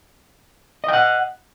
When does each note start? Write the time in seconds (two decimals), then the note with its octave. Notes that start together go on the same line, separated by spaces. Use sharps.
0.84 D#5
0.89 G5
0.93 F#5